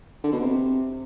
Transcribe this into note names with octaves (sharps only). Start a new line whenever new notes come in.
D3
B2
C3